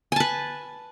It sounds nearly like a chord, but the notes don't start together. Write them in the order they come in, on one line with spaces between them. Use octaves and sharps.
G#5 A5 B4